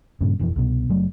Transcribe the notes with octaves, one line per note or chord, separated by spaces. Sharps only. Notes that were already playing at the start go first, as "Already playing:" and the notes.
G2 A#2 C#3
E1 F2 E3
C2 B2
F#1 F#3 A3